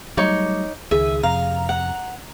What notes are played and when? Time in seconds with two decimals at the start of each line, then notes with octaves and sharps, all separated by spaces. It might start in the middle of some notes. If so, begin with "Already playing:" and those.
0.17 F#3 G3 A3 D#4 C#5 D6
0.91 C#2 D#3 G#4 E5
1.23 F2 C3 F5 A#5
1.69 F#5